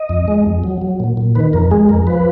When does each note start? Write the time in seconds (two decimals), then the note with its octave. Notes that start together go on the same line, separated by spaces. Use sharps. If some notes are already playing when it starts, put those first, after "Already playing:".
Already playing: D#5
0.09 F2
0.28 G#3
0.46 F2
0.64 F#3
0.82 F#3
1.00 A#2
1.17 A#2
1.35 D#3 B4
1.53 F2 A#4
1.71 G#3 G#4
1.89 F2 A#4
2.07 F3 B4